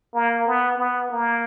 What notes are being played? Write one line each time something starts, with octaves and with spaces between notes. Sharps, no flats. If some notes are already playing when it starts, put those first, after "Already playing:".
A#3
B3
B3
A#3